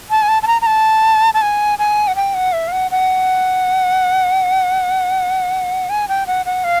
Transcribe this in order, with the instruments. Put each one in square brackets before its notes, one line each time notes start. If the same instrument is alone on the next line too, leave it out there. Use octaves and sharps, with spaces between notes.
[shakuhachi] A5
G#5
A5
A5
A#5
A#5
A5
A5
G#5
G#5
F#5
G5
F#5
E5
F5
F#5
F#5
G#5
G5
F#5
F#5
F5